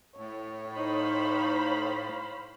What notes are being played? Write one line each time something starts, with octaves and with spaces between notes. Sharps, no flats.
A2 C#5
D#4 C5 F5 B5